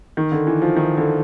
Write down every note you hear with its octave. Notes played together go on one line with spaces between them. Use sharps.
D#3
D3
E3
F3
D#3
D3